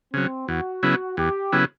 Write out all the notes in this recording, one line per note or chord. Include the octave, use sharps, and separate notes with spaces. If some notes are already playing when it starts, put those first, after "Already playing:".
C#3 F#3 C4
E2 F#4
C#3 F#3 B3 E4
E2 G4
C#3 F#3 B3 E4